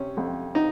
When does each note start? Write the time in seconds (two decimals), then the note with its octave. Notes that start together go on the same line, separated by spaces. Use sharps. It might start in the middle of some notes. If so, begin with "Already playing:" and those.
Already playing: C3 C#4
0.17 F2
0.55 D#4